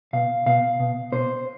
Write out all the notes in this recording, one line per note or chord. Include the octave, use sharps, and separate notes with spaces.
B2 F5
B2 F5
B2
B2 C5